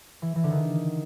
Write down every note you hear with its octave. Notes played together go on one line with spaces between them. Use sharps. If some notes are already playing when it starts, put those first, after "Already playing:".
E3
E3
D3
D#3